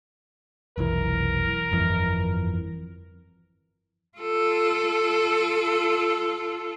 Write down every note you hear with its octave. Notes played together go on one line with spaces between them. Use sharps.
F1 B1 E3 A#4
G1 F2 E3
F4 A4